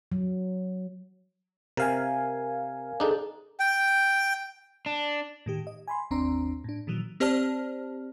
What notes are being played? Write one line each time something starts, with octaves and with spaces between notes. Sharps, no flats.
F#3
C3 A#4 F5 G#5
D4 D#4 G#4 A4
G5
D4
A2 D#3 G4
D#5
G#5 B5 C6
G1 D#2 C4 D4 A#5 C6
A2 D4
A#2 D#3 E3 F#3
C4 G4 C5 D5 A5 F6